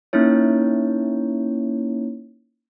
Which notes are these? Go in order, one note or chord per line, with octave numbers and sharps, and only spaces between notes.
A#3 C#4 D#4 E4 C#5